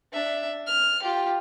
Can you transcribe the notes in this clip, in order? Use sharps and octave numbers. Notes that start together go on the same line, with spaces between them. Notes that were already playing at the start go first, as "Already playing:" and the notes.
D4 E5
F6
F4 G4